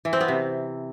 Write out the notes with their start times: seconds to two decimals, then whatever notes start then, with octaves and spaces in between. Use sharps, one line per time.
0.05 E3
0.13 C4
0.21 B3
0.28 C3